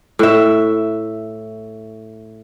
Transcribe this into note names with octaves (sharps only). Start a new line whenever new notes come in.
A2 E5